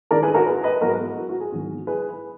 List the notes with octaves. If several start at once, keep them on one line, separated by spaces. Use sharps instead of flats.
D#3 G#3 D4 A#4 D5
G#4 B4
F#4 A#4
G#4 B4
B4 D#5
G#2 F#3 B3 D#4 F#4 A#4
F#4
F#4
G#4
G#2 D#3 F#3 B3
G#4 B4